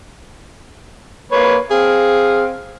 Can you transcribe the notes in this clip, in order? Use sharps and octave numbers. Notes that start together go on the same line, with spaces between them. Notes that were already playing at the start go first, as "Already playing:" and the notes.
A#3 B4 C#5
C4 G#4 F5